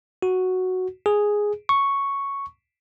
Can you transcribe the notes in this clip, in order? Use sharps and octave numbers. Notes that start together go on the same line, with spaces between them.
F#4
G#4
C#6